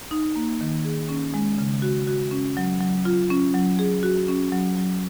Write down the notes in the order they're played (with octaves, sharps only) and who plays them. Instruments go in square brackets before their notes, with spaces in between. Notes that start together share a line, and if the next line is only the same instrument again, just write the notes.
[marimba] D#4
A#3
D#3
G#4
C#4
G#3
C#3
F#4
F#4
C#4
F#3
F#3
F4
C#4
F#3
G#4
F#4
C#4
F#3
F#3